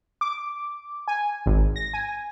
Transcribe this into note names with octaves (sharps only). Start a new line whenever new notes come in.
D6
G#5
G#1
A#6
G#5